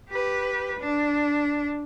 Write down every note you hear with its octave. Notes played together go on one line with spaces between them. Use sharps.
G4 B4
D4